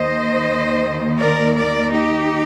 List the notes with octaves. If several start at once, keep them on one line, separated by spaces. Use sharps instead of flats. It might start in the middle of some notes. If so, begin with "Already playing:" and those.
Already playing: D#2 D#3 C5 D#5
A#4 D5
A#4 D5
D#4 G4